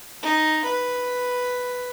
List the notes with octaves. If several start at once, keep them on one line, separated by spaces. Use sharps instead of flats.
D#4
B4